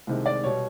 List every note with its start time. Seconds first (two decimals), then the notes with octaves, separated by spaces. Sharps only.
0.07 C2 C3 D#3 G#3
0.26 D5
0.43 B2 G3 C#5